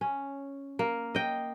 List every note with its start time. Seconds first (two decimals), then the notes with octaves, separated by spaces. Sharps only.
0.01 C#4
0.79 A#3
1.15 D#5 G5